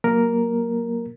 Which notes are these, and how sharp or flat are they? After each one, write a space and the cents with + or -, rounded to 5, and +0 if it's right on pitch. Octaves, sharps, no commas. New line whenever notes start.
F#3 +0 A#3 +0 A#4 +0